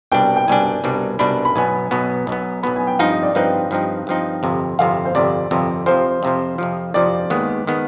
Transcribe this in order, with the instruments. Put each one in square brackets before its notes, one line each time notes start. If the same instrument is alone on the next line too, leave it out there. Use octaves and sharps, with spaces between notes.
[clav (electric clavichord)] C2 B2 G3 D4 [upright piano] G5
[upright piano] G5
[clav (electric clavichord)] C2 B2 G3 D4 [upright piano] G#5
[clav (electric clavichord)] C2 B2 G3 D4
[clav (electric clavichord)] C2 B2 G3 D4 [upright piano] B5
[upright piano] B5
[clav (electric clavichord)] B1 B2 B3 [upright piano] G#5
[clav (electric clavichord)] B1 B2 B3
B1 B2 B3
[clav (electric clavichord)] B1 B2 B3 [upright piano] B5
[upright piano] G#5
G5
[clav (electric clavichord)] G2 F3 C4 D#4 [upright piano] F5
[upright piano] D#5
D5
[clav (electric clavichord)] G2 F3 C4 D#4 [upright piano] B4
[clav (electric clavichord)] G2 F3 C4 D#4
G2 F3 C4 D#4
G1 F2 C3
[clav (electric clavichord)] G1 F2 C3 [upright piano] F5
[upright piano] C5
[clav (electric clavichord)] G1 F2 C3 [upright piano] D5
[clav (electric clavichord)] G1 F2 C3
[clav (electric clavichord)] F2 C3 F3 [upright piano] C5
[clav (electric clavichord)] F2 C3 F3
F2 C3 F3
[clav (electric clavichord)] F2 C3 F3 [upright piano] D5
[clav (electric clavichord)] D#2 D#3 G#3 B3
D#3 G#3 B3